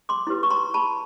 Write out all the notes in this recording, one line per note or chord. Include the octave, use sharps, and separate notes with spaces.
C6 D6
E4 G4 B4
C#6
A#5 C6
A5 B5